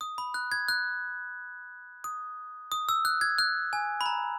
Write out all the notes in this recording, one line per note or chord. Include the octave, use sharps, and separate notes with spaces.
D#6
B5
F#6
G#6
F#6
D#6
D#6
E6
F#6
G#6
F#6
G#5
B5
A#5